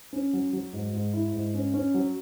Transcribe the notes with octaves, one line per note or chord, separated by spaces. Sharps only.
C#4
F#3
F#3
G#2
G#2
E4
G#2
C#4
C#4
F#3